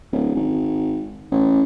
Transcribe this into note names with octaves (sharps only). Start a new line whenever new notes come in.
D1
G#1
A1